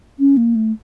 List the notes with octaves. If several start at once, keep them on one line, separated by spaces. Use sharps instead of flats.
C#4
A#3
A3